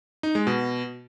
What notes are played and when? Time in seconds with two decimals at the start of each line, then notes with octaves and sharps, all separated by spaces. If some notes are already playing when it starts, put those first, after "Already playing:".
0.23 D#4
0.35 G#3
0.47 B2